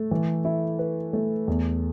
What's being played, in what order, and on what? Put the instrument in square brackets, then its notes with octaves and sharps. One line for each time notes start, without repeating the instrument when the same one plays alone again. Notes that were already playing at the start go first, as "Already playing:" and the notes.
Already playing: [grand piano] A3
E3
E4
B4
A3
E2